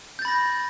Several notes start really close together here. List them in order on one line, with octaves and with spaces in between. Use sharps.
G6 A6 B5 A#6